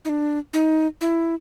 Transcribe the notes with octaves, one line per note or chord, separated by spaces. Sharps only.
D#4
D4
D#4
E4